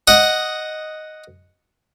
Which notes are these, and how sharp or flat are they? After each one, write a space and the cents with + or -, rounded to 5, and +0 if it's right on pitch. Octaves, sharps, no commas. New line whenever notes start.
D#5 +0 F#5 +0